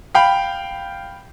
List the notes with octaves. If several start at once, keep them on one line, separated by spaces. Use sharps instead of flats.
F5 G5 B5